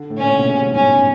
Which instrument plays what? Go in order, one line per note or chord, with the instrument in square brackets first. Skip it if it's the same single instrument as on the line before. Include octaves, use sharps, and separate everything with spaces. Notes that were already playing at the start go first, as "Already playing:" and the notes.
Already playing: [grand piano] D3
A2
[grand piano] A#2 [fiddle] C#4
[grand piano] B2
C3
C#3
B2
G#2
[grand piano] G2 [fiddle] C#4